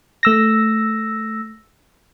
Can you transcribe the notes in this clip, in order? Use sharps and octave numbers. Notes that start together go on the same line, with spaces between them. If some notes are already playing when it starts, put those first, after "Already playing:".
A3 E6 A#6